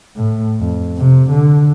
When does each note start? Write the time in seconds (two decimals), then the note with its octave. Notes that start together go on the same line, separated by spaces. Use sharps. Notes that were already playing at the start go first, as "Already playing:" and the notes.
0.16 A2
0.60 F2
0.97 C3
1.30 D3